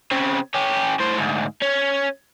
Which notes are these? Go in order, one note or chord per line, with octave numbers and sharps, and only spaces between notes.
C#3 C4
C#4 G4
A2 C5
D2 G#2
C#4